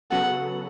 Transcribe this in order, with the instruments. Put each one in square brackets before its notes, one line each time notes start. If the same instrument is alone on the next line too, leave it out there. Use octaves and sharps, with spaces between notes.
[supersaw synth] C#3 F#3 B3 F#4 A4 [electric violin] F#5